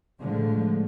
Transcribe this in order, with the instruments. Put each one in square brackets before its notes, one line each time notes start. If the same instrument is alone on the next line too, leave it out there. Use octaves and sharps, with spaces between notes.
[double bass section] A2 D3 F3 G#3 A3